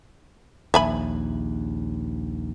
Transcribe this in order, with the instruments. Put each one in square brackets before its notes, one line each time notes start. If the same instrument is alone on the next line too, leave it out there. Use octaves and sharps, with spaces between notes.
[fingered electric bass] A#1 D#2 [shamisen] E5 G#5 B5